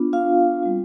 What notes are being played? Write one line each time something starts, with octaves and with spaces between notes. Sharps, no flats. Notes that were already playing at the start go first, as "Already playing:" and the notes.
Already playing: B3 D4 F4
F4 F5
G3 C4 F4